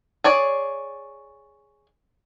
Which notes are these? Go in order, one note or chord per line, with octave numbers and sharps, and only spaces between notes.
G#4 C#5 D5